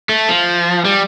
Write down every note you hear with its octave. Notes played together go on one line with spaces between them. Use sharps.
A3
F3
G3